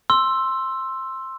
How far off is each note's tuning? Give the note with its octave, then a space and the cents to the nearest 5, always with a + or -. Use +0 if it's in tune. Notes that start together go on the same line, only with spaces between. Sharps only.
C6 +10 E6 +5